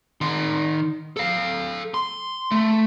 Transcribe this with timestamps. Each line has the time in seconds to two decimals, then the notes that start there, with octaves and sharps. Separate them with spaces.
0.21 D#3 C6
1.17 A4 F5
1.94 C6
2.51 A3